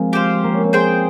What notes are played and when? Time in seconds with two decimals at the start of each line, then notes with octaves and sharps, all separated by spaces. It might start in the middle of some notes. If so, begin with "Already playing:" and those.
Already playing: F3 G#3 A#3 C4
0.13 G4 C5 F5
0.44 A#3
0.53 C#4
0.63 C4
0.73 G#4 C5 G5